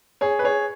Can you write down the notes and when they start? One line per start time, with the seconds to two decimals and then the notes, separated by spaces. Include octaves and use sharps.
0.21 G#4 C#5
0.39 B4
0.44 G#4 C#5